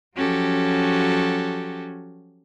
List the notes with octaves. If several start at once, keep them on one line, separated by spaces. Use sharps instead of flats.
F3 F#3 C#4 F#4 G4 A4